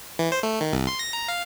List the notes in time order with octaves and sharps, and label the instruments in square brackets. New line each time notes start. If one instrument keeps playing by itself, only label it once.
[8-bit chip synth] E3
C5
A3
D#3
C2
C6
A#6
A#5
F5